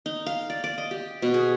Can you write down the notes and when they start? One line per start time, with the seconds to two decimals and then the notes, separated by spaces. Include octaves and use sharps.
0.06 D#4
0.26 F5
0.50 D5
0.64 D5
0.78 D#5
0.91 G4
1.22 B2
1.34 G#4